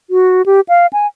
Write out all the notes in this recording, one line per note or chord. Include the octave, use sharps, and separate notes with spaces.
F#4
G4
F5
G#5